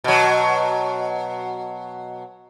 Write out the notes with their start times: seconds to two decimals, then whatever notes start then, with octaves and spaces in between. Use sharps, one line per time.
0.04 B2 F#3